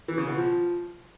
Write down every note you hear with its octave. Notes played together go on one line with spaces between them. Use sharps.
E3
C#3
B2
F3